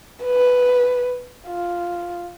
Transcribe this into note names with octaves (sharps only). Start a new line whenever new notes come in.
B4
F4